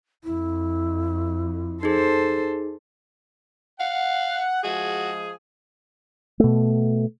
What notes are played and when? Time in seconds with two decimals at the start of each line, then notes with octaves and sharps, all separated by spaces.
0.24 F2 E4
1.83 D#4 G#4 A4 C5
3.80 F5 F#5
4.63 F3 G#3 F#4 G#4
6.40 B2 A3